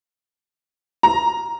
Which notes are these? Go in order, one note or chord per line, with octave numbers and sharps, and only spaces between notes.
A#5